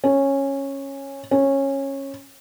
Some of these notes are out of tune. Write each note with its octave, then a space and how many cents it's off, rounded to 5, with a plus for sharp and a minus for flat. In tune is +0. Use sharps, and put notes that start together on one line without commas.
C#4 -10
C#4 -15